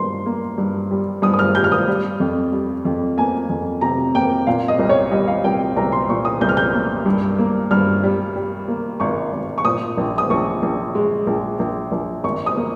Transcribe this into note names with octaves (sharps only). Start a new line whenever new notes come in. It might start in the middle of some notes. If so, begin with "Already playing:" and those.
Already playing: G2 A#3 C6
A#3
G2
G3
G2 D#6
D#6
F6
G3 G6
F6
D#6
G3
F2
G3
F2
A#3 G#5
F2
C3 A#5
A#3 G5
A#2 F5
D#5
C2
C#5
G3 D#5
F5
C2 G5
C2 A#5
C6
A#2 C#6
D#6
C2 G6
F6
G6
A#3
G2
A#3
G2 F6
G3
G3
A#3
G#1 C#6
G#1
C#6
A#2 D#6
A#1
D#6
A#1 C#6
A#1
G#3
A#1
A#1
A#1
G#1 C#6
D#6
A#3